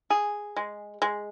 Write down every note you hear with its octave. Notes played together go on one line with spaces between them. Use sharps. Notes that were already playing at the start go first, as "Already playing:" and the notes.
G#4
G#3
G#3